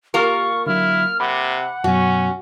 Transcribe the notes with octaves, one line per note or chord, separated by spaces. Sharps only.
A#3 F4 G4 A#4 C#6
D3 F#3 E4 F6
C3 F#5 B5 D6
F#2 B2 F#3 C#4 F#4